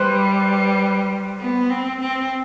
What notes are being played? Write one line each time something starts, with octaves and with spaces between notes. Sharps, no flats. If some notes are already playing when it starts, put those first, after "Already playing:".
Already playing: G3 B4 C5
B3
C4
C4